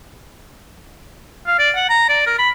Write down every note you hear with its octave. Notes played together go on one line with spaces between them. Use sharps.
F5
D5
F#5
A#5
D5
A#4
B5